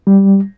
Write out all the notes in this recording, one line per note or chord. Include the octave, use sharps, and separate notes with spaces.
G3